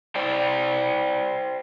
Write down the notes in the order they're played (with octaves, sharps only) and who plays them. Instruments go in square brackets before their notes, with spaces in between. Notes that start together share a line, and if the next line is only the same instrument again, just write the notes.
[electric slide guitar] C5 D5 G5